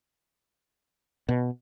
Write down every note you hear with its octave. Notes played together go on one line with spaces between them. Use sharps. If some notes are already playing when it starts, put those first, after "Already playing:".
B2